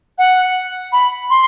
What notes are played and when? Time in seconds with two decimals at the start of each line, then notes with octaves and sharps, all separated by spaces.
0.18 F#5
0.93 B5
1.30 C6